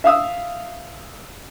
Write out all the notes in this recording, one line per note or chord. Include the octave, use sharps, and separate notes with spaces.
E5 F5 D#6 E6